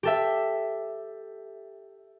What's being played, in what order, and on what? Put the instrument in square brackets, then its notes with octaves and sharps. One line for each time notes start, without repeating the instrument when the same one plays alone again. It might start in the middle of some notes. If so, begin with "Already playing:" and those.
[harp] G4 A4 E5